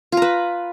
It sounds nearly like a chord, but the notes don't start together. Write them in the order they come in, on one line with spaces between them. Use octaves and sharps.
F4 A#5 B4